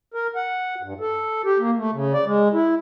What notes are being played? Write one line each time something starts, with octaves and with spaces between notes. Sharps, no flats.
A#4
F#5
G2
A4
G4
A#3
A3
C#3
D5
G#3
E4